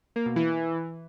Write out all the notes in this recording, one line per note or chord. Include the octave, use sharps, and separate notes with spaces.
A#3
B2
E3